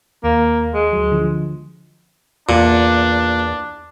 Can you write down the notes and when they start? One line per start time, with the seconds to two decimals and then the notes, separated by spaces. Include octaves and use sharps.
0.24 D#2 A#3
0.74 G#3
0.93 D2 F#3
1.12 D3 F3
2.49 E2 A#2 D4